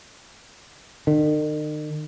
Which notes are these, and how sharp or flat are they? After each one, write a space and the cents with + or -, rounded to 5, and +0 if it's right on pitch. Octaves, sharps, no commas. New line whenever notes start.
D#3 -45